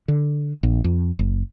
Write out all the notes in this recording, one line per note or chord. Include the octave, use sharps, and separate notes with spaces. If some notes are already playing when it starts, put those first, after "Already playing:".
D3
A#1
F2
F#1